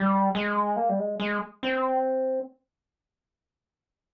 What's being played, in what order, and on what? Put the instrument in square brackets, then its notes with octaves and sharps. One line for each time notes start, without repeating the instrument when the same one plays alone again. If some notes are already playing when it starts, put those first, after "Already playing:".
Already playing: [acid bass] G3
G#3
A#3
G3
G#3
G#3
C4